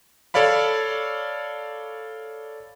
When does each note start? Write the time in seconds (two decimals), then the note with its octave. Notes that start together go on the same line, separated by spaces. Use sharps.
0.34 A4 C#5 D5 F5 B5